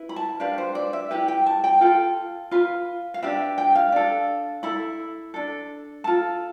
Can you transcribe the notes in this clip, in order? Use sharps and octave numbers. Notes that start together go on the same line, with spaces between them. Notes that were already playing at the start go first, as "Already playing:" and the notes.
Already playing: E4 B4
B5
A5
D4 G4 B4 F5
C5
D5
E5
E4 G4 B4 G5
G5
A5
G5
F4 A4 G5
F4 B4
F5
D4 G4 B4 E5
G5
F5
D4 A4
E4 A4 B5
D4 A4
F4 A4 A5